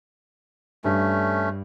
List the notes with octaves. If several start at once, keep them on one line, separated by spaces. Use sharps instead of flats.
G2 A3 C#4